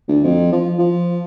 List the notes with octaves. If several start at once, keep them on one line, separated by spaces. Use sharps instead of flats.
D2
F2
F3
F3